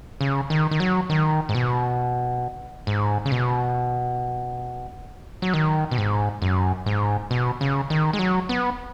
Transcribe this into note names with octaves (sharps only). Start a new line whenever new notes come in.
C#3
D#3
D#3
F#3
D#3
G#2
B2
G#2
C#3
B2
F#3
D#3
B2
G#2
F#2
G#2
B2
C#3
D#3
G#3
F#3
B3